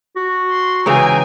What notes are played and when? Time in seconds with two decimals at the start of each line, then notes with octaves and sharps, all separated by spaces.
0.16 F#4
0.50 C6
0.86 G#2 C#3 E3 G#4 G5 G#5 A#5